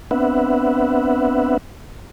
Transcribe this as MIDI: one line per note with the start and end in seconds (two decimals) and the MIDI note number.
0.11 1.58 59
0.11 1.58 60
0.11 1.58 62
0.11 1.58 71
0.11 1.58 76
0.11 1.58 78